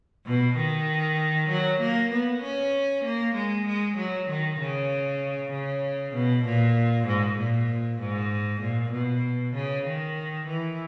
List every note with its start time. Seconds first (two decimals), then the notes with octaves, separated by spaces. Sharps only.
0.25 B2
0.56 D#3
1.49 F#3
1.80 A#3
2.11 B3
2.42 C#4
3.04 A#3
3.35 G#3
3.66 G#3
3.97 F#3
4.28 D#3
4.59 C#3
5.52 C#3
6.14 B2
6.45 A#2
7.07 G#2
7.38 A#2
8.00 G#2
8.61 A#2
8.92 B2
9.54 C#3
9.86 D#3
10.47 E3